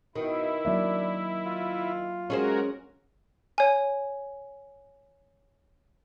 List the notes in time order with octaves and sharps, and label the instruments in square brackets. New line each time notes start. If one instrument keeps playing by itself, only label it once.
[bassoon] B2 [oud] D#3 [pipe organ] E4
[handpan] F#3 A#3 E5 [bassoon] D4
[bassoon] F4
[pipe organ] G#3 F#4 A#4 [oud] C#4 G#4 C5
[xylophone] C#5 G#5